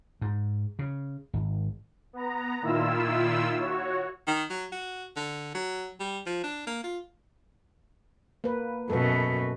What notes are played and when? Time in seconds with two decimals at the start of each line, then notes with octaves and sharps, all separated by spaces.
0.21 G#2
0.79 C#3
1.33 G#1
2.13 B3 A#5
2.61 A#2 D#3 E4 F4 E6
3.57 F#4 C#5
4.27 D#3
4.50 F#3
4.72 F#4
5.17 D3
5.55 F#3
6.00 G3
6.26 F3
6.44 D4
6.67 A#3
6.84 F4
8.44 A#3 B4
8.90 F#2 B2 A4 B4